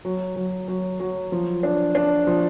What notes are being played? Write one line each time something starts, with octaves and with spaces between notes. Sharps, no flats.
F#3
F#3
F#3
F#3
F3
D4
D4
F3